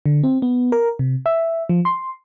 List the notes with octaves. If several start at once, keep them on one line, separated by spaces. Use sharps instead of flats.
D3
C4
B3
A#4
C3
E5
F3
C6